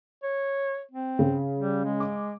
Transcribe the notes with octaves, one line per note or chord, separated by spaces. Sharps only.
C#5
C4
C#3
G3
G#3
D6